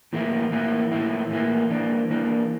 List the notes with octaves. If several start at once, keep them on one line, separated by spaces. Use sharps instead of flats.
A2 E3 A#3 E4
A2 E3 A#3 E4
A2 E3 A#3 E4
A2 E3 A#3 E4
E3 A#3 D4
E3 A#3 D4